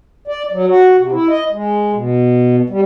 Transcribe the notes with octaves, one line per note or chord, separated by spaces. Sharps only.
D5
F#3
F#4
C3
E4
D#5
G#3
B2
G3